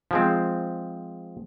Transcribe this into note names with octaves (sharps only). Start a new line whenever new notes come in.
F3 G#3 C4